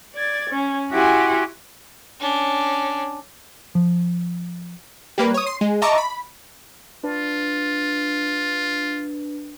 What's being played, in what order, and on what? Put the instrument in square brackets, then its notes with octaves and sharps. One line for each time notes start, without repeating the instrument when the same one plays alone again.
[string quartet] D5 G#6 A6
C#4
E4 F#4 G4 F#5 G#5 C6
[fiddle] C#4 D4
[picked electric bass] F3
[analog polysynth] G3 A#3 B4
C#5 D#6
C6
G#3
D#5 E5 A5 A#5 C#6 D6
B5
[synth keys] D4 B4 [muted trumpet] F4